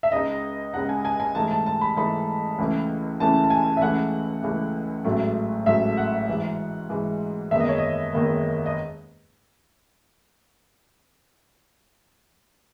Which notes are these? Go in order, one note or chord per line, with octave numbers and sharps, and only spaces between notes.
E5
C#2 C#3 G#3 D#4 D#5
C#2 C#3 G#3 D#4 F#5
G#5
G#5
G#5
G#2 E3 A3 D#4 A5
A5
A5
B5
G#2 E3 A3 D#4 B5
C#2 C#3 E3 A3 E4
C#2 C#3 E3 A3 E4 A5
A5
G#5
E5
C#2 C#3 E3 A3 F#5
C#2 C#3 E3 A3
A1 G#2 F#3 A3
A1 G#2 F#3 A3 E5
F#5
G#2 E3 G#3
G#2 E3 G#3
F#1 E2 D#3 G#3 B3 E5
D#5
C#5
D#5
F#1 E2 D#3 G#3 B3
D#5